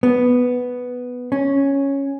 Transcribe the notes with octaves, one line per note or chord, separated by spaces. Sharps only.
B3
C#4